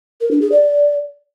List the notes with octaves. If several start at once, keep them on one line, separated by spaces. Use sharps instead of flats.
A#4
D4
G#4
D5